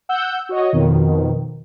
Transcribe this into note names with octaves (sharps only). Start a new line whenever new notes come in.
F#5 E6 G6
F#4 C#5 D#5
F2 B2 D#3 F3